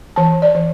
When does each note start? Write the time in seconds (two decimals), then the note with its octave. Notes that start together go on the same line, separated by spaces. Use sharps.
0.16 E3 A5
0.42 D5
0.55 E3